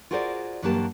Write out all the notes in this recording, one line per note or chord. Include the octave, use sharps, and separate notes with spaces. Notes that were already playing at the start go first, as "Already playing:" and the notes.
F4 F#4 G#4 A#4 C5 D5
G2 E3 F#3 A#3 G4 A5